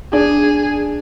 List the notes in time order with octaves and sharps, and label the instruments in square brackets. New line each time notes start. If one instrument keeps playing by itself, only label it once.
[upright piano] D4 [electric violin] G#4